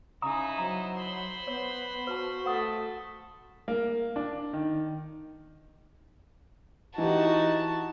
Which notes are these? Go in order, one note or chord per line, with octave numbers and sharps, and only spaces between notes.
C#3 D#4 E4 A#5 D#6
F#3 C5 A#5
B5 C6
B3 C#5
F#4 B4 A5
A3 F#5 D#6
A#3
D4
D#3
E3 D#4 F#4 G4 A5